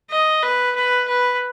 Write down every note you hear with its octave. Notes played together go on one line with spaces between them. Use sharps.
D#5
B4
B4
B4